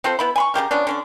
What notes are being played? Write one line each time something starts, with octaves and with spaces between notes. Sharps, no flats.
C4 F4 A4 C5
B3 E4 B5
G#5 B5 C#6
C#3 G#3 G4 A#4
F3 B3 C#4 D4
D3 C#4 D4